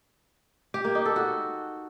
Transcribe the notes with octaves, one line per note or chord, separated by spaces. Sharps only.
G4
A#3
D#4
A4
F#4